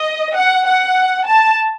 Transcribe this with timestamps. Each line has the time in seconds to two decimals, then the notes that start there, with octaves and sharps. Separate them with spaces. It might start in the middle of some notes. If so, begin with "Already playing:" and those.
Already playing: D#5
0.36 F#5
0.66 F#5
1.27 A5